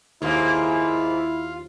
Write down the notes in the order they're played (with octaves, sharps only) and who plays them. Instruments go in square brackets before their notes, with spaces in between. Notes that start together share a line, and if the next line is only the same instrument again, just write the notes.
[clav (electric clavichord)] D#2 [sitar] G#2 A#3 [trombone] E4 [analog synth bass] F4